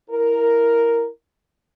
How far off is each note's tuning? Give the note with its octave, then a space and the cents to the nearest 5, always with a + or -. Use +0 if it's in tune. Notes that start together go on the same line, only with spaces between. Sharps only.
E4 +0 A#4 +0